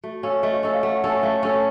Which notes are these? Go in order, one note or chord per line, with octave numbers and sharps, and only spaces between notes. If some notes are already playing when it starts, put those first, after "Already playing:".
A3 F#4
C#4 A4 F5
A3 D#5
F5
C#4 A4 D#5
F5
A3 F#5
F#5
C#4 A4
A5
A3 F5
C#4 A4 A5